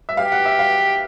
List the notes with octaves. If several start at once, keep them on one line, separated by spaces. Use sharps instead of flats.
E5
G4 F5
F#5
E5
F5